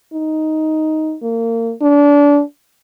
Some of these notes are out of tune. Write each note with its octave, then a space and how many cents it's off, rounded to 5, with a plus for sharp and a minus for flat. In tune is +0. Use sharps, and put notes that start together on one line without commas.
D#4 +5
A#3 -30
D4 -25